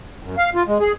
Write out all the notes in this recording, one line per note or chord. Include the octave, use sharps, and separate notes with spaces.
F#2
F5
F4
G#3
G#4